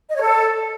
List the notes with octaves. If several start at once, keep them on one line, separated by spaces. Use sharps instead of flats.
D#5
C#5
A4